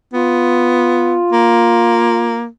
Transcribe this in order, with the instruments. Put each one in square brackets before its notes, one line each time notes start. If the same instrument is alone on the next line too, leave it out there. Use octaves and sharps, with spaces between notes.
[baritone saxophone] B3 [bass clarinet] F4
[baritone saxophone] A#3